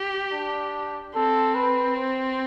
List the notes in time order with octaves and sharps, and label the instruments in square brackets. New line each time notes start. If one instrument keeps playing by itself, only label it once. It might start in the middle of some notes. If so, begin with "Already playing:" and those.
Already playing: [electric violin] G4
[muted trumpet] D4
[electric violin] C4 [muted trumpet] A4
[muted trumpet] B4
C5